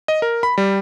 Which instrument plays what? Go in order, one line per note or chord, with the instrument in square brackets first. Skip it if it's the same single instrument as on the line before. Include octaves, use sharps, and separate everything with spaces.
[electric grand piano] D#5
A#4
B5
G3